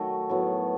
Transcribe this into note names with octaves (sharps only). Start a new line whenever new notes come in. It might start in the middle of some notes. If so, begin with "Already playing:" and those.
Already playing: D#3 F#3 A3 F#4
A2 F#3 B3